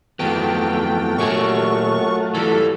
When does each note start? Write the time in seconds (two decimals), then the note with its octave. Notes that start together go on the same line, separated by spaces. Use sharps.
0.19 F2 E3 F#3 A3 B3 F4 G5
1.18 F#2 A#2 G4 G#5 C#6
2.34 E3 G3 A4